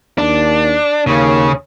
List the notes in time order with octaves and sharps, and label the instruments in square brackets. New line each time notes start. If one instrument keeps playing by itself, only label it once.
[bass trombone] D#2 [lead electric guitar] D4
[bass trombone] D#2 [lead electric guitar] C#3 C#4